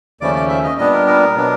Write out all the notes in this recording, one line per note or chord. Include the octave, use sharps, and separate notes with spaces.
D#2 C#3 F3 A3 C#4 D5
D5
E5
D#5
A#2 G3 B3 D4 D#5
A#4
A#4
B2 F#3 B3 D4